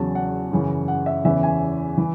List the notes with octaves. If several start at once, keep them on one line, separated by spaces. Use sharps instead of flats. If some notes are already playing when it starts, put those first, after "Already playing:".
Already playing: E2 C#3 F#3 A5
F#5
F#2 C#3 E3
F#5
E5
E2 C#3 E3 E5
G#5
E3